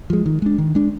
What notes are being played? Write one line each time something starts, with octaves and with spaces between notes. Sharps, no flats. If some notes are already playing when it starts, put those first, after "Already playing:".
F3 G#3
D#3
G#3 D4
D#3
G#3 D4